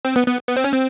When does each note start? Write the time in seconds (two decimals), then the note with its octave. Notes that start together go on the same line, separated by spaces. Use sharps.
0.05 C4
0.16 B3
0.27 B3
0.48 B3
0.57 C4
0.64 C#4
0.73 C4